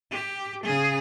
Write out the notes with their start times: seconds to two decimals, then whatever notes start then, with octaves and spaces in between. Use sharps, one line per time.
0.12 G4
0.64 C#3 G#4